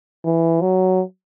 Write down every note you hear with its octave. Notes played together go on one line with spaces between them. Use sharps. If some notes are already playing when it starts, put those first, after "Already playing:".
E3
F#3